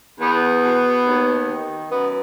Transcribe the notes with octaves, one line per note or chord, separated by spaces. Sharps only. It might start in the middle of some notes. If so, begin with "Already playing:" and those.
E2 B3
B2
D#2
D#3
F#2 B3